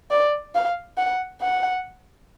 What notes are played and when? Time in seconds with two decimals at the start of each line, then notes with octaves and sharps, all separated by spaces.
0.11 D5
0.54 F5
0.98 F#5
1.42 F#5